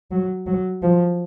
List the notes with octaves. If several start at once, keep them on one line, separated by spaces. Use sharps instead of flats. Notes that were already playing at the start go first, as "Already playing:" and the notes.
F#3
F#3
F3